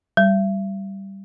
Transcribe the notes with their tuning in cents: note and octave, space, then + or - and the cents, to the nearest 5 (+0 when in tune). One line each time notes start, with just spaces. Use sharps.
G3 -5